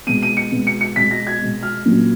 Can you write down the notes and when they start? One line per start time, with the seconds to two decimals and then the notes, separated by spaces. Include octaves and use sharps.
0.07 B2 G#3 B3 D#7
0.22 D#7
0.37 C#7
0.52 B2 G#3 B3
0.67 C#7
0.81 C#7
0.96 B2 G#3 B3 B6
1.11 A#6
1.27 G#6
1.42 B2 G#3 B3
1.63 F6
1.85 A#2 F#3 A#3 C#4